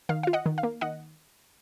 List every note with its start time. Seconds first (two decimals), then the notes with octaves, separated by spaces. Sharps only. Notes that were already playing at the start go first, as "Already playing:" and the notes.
0.09 D#3 F5
0.23 F4 F5
0.33 D#5 F#5
0.46 D#3
0.58 F5
0.63 A#3
0.81 D#3 D#5 F#5